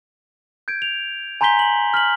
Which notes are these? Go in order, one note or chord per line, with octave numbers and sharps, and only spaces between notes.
G6 G#6 D7
F7
G#5 A#5 C6 G6 B6 G7
F#7
F6 B6 F#7